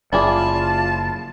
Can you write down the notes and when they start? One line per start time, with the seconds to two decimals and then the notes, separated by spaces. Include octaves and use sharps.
0.13 F#1 E4 F4 G#4 D5 A5